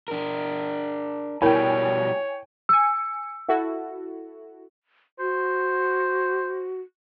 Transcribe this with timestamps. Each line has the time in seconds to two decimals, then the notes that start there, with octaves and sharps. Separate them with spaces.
0.08 D4 A#4
1.42 B2 G3 E4 A#4 C#5 G5 G#5
2.69 G#5 E6 C#7
3.48 E4 F#4 A4
5.19 F#4 C5